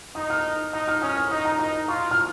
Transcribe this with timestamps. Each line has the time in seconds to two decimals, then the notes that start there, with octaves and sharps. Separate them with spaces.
0.15 D#4 D#6
0.30 F6
0.73 D#4 D#6
0.88 F6
1.02 C#4 D#6
1.17 F6
1.31 D#4 D#6
1.45 A#5
1.59 D#4 D#6
1.88 F4 C#6
2.11 F6